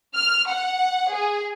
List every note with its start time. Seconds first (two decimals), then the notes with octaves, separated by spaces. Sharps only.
0.16 F6
0.51 F#5
1.14 G#4